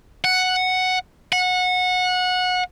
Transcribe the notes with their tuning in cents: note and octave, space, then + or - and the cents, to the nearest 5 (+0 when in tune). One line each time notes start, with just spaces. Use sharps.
F#5 +0
F#5 -20